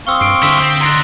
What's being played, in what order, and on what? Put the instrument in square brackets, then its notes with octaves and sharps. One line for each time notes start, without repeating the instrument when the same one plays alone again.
[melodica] C4 F5 C#6 [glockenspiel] D#6 E6 G7
[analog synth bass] G2 [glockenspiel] C7 D7
[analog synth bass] D3 [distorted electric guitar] E4 C5 [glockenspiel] E6 B6
[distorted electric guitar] C4
[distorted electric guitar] G#2 D4 [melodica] A#5 C6